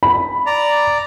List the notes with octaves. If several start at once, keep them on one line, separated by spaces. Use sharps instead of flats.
B5
D5 A#5